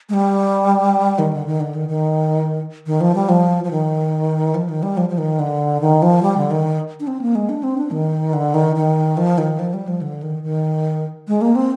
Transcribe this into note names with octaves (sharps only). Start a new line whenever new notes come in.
G#3
G3
D#3
D3
D#3
D3
D#3
D#3
D#3
F3
G3
F3
F3
D#3
F3
D#3
G3
F3
F3
D#3
D3
D#3
F3
G3
D3
D#3
D4
C4
A#3
G#3
D4
C4
D4
D#3
D3
D#3
D#3
F3
D#3
F3
G3
F3
D3
D#3
D#3
G#3
A#3
C4